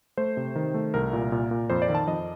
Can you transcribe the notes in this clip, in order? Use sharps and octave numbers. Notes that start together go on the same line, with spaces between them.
A3 C5
C3
D#3
A3
C2 A#4
A#2
A#2
A#2
F2 C5
D5
D#3
A5
F2 D#5